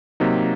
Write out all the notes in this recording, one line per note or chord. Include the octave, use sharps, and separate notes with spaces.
C3 F#3 A#3 D#4